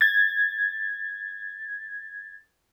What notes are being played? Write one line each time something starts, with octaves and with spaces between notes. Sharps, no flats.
G#6 A6